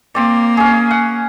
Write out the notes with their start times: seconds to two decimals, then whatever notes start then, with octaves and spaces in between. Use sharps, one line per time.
0.15 A#3 C4 D5
0.57 C#4 G#4
0.91 F#5